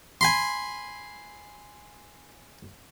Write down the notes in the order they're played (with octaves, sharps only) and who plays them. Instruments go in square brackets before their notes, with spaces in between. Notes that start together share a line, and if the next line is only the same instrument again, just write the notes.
[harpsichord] G#5 B5 C6